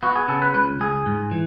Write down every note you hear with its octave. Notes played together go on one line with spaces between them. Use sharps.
B3 F#4
G#4
C#3 A4
B4
C#2 B4
C#2 G#4
G#2
E3